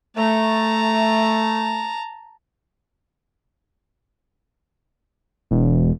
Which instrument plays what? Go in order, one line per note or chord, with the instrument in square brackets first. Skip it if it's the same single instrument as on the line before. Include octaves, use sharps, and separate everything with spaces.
[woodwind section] A3 [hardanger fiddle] A5 A#5
[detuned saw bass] E1